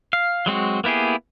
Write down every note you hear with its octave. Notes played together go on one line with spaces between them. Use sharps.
F5
F#3 G#3 C4 F#4
A#3 B3 E4 G4 G#4